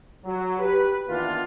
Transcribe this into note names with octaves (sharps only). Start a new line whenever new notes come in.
F#3
G4 B4
D#3 E3 A#3 B3 D4 F4